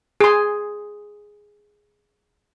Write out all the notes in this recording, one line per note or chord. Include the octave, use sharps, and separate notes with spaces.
G#4 C6